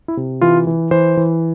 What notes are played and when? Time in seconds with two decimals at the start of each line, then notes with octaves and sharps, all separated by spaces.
0.08 E4
0.17 C3
0.41 E3 F4
0.67 E3
0.91 E3 C5
1.17 E3